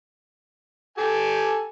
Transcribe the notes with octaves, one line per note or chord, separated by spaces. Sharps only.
G4 A4 G#5